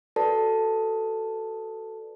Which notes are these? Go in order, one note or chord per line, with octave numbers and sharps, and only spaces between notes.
F#4 A4 B4 D5 A5